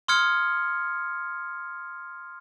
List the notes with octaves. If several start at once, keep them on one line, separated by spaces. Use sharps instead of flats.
C6 D#6 F6 G#6 C#7